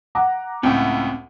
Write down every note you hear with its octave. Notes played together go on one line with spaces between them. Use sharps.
F#5 A#5 D6
C#2 A2 C4 C#4 G5